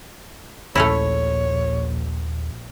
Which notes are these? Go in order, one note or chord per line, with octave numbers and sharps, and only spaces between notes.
A#1 D#2 A3 C#4 E4 C#5